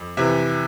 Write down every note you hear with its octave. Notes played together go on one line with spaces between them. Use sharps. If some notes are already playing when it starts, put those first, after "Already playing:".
Already playing: F2
C3 E3 E5